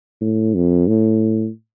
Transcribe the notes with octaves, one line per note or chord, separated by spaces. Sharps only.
A2
F2
A2